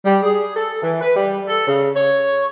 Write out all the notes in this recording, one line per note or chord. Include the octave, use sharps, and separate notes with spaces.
G3
G#4
A4
E3
B4
G3
A4
C#3
C#5